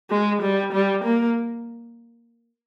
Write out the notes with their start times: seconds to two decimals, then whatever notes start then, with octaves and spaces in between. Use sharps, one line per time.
0.10 G#3
0.42 G3
0.73 G3
1.04 A#3